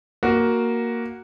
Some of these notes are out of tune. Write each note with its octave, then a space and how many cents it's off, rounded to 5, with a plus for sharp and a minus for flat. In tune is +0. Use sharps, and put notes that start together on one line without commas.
A#3 +0 F#4 +0